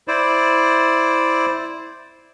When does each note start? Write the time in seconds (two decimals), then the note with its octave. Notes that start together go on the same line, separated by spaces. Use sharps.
0.08 E4 C5 D5